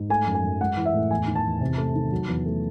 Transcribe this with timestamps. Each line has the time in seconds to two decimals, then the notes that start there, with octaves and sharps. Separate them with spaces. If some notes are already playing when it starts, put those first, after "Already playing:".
Already playing: G#2
0.10 A3 G#5
0.27 F#2
0.34 G#5
0.43 F#2
0.61 G#3 F#5
0.77 E3
0.86 E5
0.94 A2
1.11 E2 G#5
1.27 D#3
1.35 A5
1.44 E2
1.61 C3
1.78 A3
1.95 D#3
2.11 F#3
2.28 E2
2.46 A3